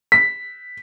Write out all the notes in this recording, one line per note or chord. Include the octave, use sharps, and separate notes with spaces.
B6